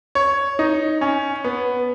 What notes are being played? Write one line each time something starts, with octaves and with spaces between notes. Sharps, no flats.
C#5
D#4
C#4
B3